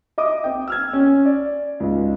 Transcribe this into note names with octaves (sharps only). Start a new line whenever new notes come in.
D#5 E5 D6 D#6
C4 G5
E6 F6 G#6
C#4
D5
C#2 G#2 F4